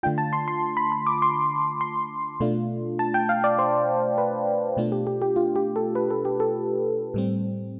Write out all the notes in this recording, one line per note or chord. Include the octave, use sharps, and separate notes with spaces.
D3 A3 D4 F4 G5
A5
C6
C6
B5
B5
D6
C6
C6
B2 A3 D4 F4
A5
G5
F5
D5
C5
B4
B2 A3 D4 F4
G4
G4
G4
F4
G4
A4
B4
A4
G4
A4
A2 G3 C4